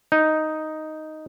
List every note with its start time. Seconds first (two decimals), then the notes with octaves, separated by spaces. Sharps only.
0.12 D#4